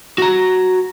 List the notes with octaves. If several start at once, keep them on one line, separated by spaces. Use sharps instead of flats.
F#4 A#5